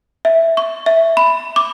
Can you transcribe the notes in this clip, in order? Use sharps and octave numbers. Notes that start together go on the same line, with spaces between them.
E5
C#6
E5
B5
D6